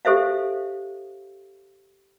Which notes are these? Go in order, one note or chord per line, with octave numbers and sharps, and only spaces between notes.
G4 A4 C5 E5 F5